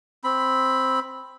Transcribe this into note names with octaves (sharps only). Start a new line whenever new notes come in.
C4 B5